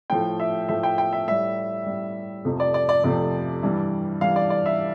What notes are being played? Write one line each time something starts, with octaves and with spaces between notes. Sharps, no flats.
A2 F3 A3 G5
E5
A2 F3 A3 E5
G5
G5
E5
A2 G3 E5
A2 G3
F2 C3 F3 A3
D5
D5
D5
F2 C3 F3 A3 D5
G2 E3 G3
G2 E3 G3 F5
D5
D5
E5